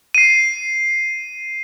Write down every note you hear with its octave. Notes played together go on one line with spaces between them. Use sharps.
C7 D#7